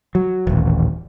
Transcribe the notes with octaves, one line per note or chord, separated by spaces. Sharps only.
F#3
D#1 A1